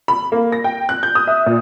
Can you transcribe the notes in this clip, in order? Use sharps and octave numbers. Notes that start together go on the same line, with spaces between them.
B5
A#3
A#6
G5
F#6
G6
D#6
E5
A#2